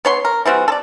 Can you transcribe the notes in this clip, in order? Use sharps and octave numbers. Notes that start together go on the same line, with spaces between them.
B3 C#5 C6
A#4
E3 G3 C4 F#4
A4 D5